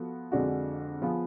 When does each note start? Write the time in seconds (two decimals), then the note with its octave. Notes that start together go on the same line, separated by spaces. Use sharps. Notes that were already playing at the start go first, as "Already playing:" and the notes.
Already playing: F3 B3 F#4 A4
0.32 F2 D3 G#3 D4 F#4
1.02 F3 B3 F4 G#4